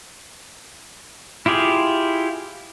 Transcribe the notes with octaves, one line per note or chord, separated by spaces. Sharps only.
E4 F4 G4 G#4